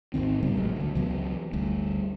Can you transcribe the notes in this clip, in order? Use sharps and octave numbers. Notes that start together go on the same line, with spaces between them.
G#1 D#2 D#3 C4
A1 C#3 G3 B3
E1 A1 F#3 G#3
D2 D3
C#2 E3 F#3 B3
G1 D2 G2